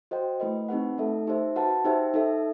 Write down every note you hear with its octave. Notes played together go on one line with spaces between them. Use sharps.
F#4 C5 D#5 G5
A3 E4 B4 D#5
C4 D#4 G4 B4 F#5
A3 D#4 A4 E5
D#4 G4 C5 E5
F#4 B4 F#5 A5
D#4 G4 C5 E5 G5
D#4 A4 E5